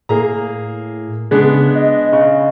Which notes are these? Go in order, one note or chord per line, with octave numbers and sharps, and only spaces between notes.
A2 A#3 G#4 A#5
C#3 G#3 B3 D4
D#5
C#3